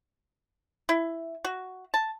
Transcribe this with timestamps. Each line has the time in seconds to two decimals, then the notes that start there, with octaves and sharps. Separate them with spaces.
0.89 E4
1.45 F#4
1.94 A5